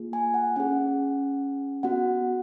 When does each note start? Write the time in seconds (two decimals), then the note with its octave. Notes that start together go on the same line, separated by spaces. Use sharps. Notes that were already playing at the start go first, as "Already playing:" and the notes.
Already playing: A#3 F4 G#4
0.13 G#5
0.34 F#5
0.56 C#4 G#4 F#5
1.83 B3 F#4 F#5